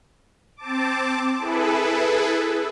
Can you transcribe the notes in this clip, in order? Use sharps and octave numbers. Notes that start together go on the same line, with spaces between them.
C4 A5 D6
E4 G#4 A4 B4